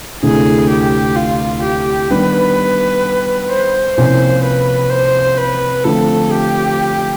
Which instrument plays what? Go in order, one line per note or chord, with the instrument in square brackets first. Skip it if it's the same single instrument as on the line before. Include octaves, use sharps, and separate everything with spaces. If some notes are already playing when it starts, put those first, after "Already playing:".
[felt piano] D2 C3 E3 A3 D4 [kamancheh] G#4
[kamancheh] G4
F4
G4
[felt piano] D#3 G3 B3 D4 [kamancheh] B4
[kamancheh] C5
[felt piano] C2 C3 F3 A#3 C#4 [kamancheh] C5
[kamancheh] B4
C5
B4
[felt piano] D3 F3 A3 C4 F4 [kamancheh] A4
[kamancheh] G4